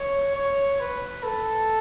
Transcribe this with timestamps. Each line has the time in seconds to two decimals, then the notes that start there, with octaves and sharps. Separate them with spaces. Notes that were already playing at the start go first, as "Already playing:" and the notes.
Already playing: C#5
0.36 C#5
0.80 B4
1.23 A4